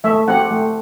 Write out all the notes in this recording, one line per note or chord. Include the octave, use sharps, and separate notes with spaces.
A3 E5
C4 G4 F#5
A3